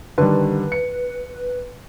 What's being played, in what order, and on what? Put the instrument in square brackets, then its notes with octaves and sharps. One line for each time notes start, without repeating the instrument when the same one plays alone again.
[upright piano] D3 D#3 G3 [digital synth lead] B4
[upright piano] C#7